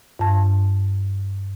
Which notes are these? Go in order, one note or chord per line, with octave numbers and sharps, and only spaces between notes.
G2 A5